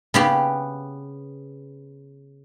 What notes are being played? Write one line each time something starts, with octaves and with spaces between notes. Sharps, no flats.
C#3 B3 G4